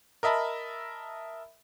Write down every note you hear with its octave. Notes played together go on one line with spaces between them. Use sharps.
A#4 D#5 E5 A5 B5